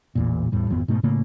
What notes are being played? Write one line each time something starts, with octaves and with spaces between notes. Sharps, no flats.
A1 E2 A#2
E2 A2 G3
G#1 F2 B3
G#2 B2 A3
A2 C#3 A3 A#3